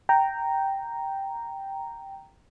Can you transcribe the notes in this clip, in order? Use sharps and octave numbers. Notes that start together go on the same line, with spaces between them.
G5 A#5